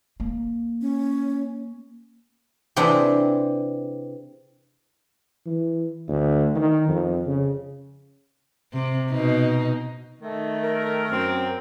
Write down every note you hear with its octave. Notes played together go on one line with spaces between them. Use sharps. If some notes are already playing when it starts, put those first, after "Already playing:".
A#3
C#4
C3 E3 C4 D4 G#4
E3
D2
D#3
F2
C#3
C3
B2 D#4
D#3 A3
A#4
F#2 C4